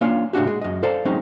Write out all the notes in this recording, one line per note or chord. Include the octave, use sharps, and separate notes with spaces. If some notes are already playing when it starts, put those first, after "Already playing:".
A#3 C#4 D4 F4 C#5 F5
A2 C#3 D4 F#4 G4
G#3
F#2 D#5
A4 C5 D5 F5 A5 A#5
F#3 G#3 C4 C#4 D#4